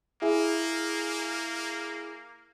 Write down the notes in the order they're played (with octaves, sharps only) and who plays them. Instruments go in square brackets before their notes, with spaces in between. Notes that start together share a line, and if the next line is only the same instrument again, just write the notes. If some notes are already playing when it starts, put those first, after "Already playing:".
[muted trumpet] A#3 [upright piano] E4 G#4